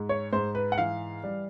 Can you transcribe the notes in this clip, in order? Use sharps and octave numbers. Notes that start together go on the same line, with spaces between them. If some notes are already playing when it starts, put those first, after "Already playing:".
Already playing: G#2
C#5
G#2 C5
B4
F#5
E3 F5
G3